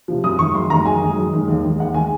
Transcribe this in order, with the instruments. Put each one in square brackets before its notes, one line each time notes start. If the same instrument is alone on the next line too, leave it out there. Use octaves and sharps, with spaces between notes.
[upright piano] C3 F3
F#2 D#6
D#3 G#3 C#6
F#2 C6
D#3 G#3 A#5
F#2 G#5
D#3 G#3
F#2
D#3 G#3
D#2
D#3 G#3
D#2 F#5
D#3 G#3 G#5